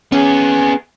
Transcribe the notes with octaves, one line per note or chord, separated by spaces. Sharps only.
B3 C#4 G#4